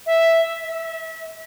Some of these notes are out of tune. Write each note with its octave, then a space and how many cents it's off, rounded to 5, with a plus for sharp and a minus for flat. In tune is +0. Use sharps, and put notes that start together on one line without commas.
E5 -5
E5 -30